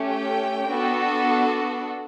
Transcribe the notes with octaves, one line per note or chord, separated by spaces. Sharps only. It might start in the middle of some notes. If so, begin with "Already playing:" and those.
Already playing: A3 C#4 G4
G5
B3 D4 F#4 A4